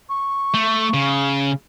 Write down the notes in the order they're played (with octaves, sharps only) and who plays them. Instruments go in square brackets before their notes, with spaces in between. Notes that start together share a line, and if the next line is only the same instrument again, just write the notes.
[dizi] C#6
[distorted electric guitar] A3
C#3